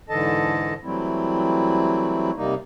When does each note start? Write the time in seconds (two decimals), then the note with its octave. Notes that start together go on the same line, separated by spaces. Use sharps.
0.09 G#2 D3 E3 A4 D#5 A5
0.83 E3 F#3 G3 A3 C4 E4
2.36 C3 G3 A#3 D#4